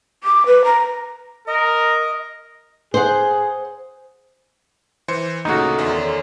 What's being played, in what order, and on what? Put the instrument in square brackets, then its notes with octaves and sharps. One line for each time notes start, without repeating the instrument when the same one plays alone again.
[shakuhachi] D6
B4
A#5
[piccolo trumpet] A#4 [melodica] D#5
[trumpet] G#4 [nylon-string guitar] C5 F#5
[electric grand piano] E3 C5 C#7
[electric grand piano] D2 A#2 C#3 [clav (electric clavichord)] D#4 F#4 [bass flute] A4
[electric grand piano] E2 D#3 E5 [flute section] C#5 D5 C6